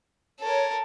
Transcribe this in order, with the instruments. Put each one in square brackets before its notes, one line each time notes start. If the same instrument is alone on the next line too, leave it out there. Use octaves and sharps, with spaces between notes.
[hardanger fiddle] A4 A#4 [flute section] C#5